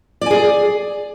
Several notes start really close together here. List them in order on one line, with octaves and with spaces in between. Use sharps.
D5 G#5 G#4